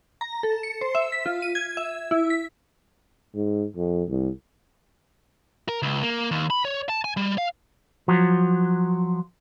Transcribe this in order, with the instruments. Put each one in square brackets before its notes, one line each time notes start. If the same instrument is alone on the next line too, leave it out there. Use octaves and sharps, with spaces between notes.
[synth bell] A#5
A4
C#7
C5
E5
B6
F4
D#7
G#6
E5
E4
B6
[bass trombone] G#2
F2
C2
[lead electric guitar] A#4
C#2
A#3
D#2
B5
C#5
A5
G#5
G3
F5
[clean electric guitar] F3 F#3